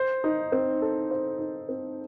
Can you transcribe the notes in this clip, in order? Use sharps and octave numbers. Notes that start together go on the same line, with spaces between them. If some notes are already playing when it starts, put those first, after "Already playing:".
Already playing: C5
D#4
C4
A4
C5
D#4
C4